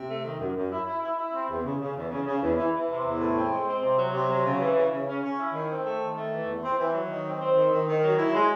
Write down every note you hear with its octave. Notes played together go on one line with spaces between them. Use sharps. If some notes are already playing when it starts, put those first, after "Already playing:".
Already playing: C3
A3
D#3
F#2
F#2
E4
E4
E4
E4
C4
E2
C#3
C#3
E2
C#3
C#3
E2
E3
E3
C3
E2
A2
C4
G#3
C4
C3
F#3
C3
F#3
C#3
E3
C#3
C#3
C#4
C#4
E4
D#3
C4
A3
D#3
A3
E3
E2
C4
E3
F#3
D#3
C4
C4
D#3
D#3
D#3
F#3
E4
G#3